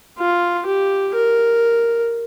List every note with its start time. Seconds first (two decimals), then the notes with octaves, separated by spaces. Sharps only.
0.19 F4
0.66 G4
1.15 A#4